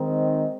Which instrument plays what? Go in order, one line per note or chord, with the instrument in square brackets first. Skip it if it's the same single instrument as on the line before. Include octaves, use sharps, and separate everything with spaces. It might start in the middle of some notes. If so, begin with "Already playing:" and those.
Already playing: [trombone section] D#3 G#3 C4 D#4